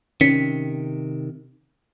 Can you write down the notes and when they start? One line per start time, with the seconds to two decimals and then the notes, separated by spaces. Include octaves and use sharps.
0.21 C3 D#3 C#4 B6 C#7